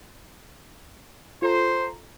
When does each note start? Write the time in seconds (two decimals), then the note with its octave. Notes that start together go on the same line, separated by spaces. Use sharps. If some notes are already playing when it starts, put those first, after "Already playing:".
1.42 F4 A4 C5 A#5